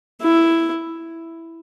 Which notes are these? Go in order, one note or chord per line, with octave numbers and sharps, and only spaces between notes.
E4